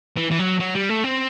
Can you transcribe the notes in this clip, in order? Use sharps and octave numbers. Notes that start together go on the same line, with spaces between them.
E3
E3
F#3
F#3
G3
A3
C4